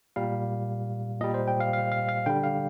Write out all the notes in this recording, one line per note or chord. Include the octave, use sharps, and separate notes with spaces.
A#2 G3 F5
A#2 G3 D#5
C5
G5
F5
F5
F5
F5
D3 G3 G5
F5